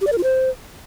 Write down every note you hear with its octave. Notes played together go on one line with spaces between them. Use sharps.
G4
D5
A#4
F4
C5